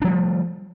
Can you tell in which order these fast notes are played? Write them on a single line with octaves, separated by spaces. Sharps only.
D4 F3 G3 A3